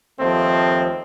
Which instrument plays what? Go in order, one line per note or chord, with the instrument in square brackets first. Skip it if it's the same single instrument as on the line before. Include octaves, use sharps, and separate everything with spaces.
[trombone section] D#2 F3 A3 C4